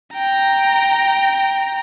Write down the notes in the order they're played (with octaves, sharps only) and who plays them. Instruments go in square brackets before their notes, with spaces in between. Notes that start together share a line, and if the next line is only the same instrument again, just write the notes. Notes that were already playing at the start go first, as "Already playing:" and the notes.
[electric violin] G5 A#5